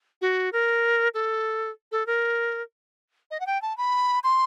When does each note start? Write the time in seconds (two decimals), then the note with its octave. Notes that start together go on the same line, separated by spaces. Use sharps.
0.21 F#4
0.52 A#4
1.14 A4
1.92 A4
2.06 A#4
3.31 D#5
3.40 F#5
3.47 G5
3.62 A5
3.77 B5
4.24 C6